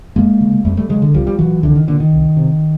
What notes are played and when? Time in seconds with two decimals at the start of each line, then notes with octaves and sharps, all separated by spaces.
0.15 F2 G#3 A#3
0.41 C#3
0.65 F2 G3 A3
0.77 G3 A3
0.89 C#3 F#3 G#3
1.02 D3
1.14 C2 F3 G3
1.27 G3
1.39 A#2 E3 F#3
1.62 C2 D3 E3
1.75 D#3
1.87 A#2 D3
2.00 D#3
2.13 C2
2.37 C3